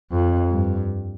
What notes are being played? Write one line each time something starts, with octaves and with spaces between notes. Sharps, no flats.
F2
G2